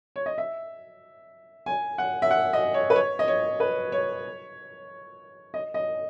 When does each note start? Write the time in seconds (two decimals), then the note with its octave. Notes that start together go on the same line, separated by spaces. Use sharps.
0.16 C#5
0.26 D#5
0.38 E5
1.66 G#5
1.98 F#5
2.22 E5
2.31 F#5
2.53 D#5
2.74 C#5
2.90 B4
2.96 C#5
3.19 D#5
3.28 C#5
3.60 B4
3.92 C#5
5.54 D#5
5.74 D#5